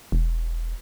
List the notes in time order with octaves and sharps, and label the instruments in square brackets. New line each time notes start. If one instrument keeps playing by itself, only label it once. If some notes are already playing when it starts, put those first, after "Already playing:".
[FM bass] E1